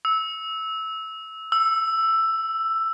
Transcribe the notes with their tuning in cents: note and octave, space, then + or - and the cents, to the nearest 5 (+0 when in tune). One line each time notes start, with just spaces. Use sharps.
E6 -15
E6 +10